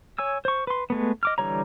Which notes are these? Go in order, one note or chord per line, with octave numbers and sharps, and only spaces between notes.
C#5 G#5 E6
C5 C#6
B4 C6
G#3 A3 B3
D#5 D6 F6
D3 E3 G3 C#5 A#5